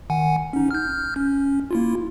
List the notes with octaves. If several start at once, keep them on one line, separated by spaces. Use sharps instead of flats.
D#3 F#5 G#5
C#4 D#4
F6 G6
C#4
A#3 E4 F4